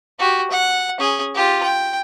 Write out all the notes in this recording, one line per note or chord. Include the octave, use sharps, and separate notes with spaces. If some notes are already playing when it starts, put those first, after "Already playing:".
F#4 G4
F#5
C#4 G#4
F4 G4
G5